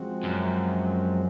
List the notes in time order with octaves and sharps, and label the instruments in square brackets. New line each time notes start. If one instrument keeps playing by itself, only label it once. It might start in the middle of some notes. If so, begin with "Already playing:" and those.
Already playing: [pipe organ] F3 G#3 C4 F#4
[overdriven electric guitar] F#2